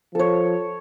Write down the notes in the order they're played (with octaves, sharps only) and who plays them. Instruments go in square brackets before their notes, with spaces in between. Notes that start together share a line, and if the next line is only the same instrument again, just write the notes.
[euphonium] F3 [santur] A4 C#5